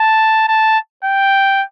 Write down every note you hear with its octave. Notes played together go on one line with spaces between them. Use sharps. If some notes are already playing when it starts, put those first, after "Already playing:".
Already playing: A5
A5
G5